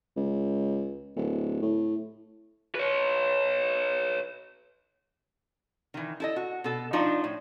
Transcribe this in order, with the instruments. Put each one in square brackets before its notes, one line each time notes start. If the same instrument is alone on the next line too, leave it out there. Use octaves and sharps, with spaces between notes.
[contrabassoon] C#2
D1
A2
[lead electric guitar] B4 C#5
[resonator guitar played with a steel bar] D#3 E3
E4 A4 D#5
F#4
B2 A4
F3 D4 D#4 F#4 F5
A2